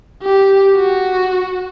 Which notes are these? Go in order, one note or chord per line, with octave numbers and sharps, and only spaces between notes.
G4
F#4